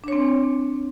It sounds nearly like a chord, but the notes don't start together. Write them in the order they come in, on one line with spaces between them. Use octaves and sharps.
D4 C#5 C4